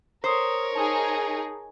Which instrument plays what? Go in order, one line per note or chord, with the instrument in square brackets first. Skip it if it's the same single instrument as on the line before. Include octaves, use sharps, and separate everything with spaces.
[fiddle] A#4 C#5 [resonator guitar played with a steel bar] C5 [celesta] A#5 D#6
[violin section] D#4 G#4 [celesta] A5 D#6